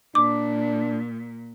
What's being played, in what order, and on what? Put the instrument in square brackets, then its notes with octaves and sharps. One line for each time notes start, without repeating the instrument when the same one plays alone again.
[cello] A#2 [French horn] D4 [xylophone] D6